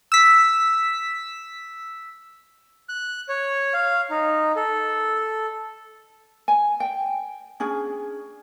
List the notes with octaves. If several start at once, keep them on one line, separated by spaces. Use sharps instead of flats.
E6 B6
F#6
C#5
F5
D#4
A4
G#5
G5
C#4 D4 G#4